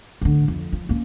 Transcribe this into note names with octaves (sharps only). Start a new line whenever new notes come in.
A2 D3
F2
F3
A#3 C#4